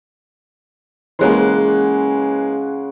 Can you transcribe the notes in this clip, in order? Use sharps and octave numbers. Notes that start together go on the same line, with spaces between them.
C#3 E3 G#3 A#3 F#5 C6